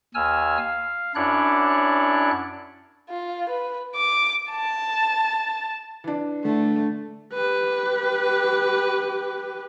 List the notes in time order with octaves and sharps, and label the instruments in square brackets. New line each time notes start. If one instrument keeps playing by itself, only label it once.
[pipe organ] D#2 G#5 E6 F6
F5
F#2 D4 E4 C#5 D5 F#6
[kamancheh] F4
B4
D6
A5
[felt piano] E3 D4
[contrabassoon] D3 [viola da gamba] A3
[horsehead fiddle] G4 B4